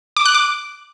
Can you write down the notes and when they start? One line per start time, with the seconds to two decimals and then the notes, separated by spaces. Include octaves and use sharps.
0.17 D6
0.25 F#6
0.34 D6